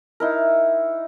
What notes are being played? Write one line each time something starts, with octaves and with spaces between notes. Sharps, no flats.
D#4 E4 A#4